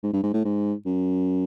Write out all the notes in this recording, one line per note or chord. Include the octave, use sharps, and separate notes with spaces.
G#2
G2
G#2
A2
G#2
F#2